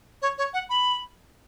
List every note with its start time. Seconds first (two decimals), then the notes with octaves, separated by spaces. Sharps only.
0.22 C#5
0.38 C#5
0.54 F#5
0.70 B5